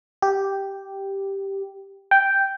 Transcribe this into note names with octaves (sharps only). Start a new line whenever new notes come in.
G4
G5